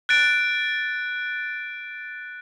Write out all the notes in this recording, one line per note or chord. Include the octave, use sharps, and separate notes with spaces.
F#6 A6 D7